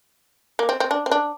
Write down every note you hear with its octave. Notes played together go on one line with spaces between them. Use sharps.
A#3
C4
C4
D4
C4
D4